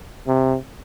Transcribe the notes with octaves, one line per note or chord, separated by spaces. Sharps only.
C3